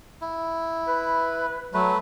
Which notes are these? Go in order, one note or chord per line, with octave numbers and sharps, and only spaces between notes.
E4
B4
F#3 A3 B4